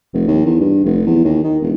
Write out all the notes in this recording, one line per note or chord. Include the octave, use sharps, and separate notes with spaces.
F1
D#2
E2
G2
F1
E2
D#2
D#3
E1